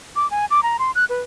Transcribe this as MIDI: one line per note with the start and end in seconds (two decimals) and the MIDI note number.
0.16 0.29 86
0.31 0.46 80
0.51 0.63 86
0.63 0.77 82
0.79 0.91 84
0.95 1.05 90
1.09 1.21 71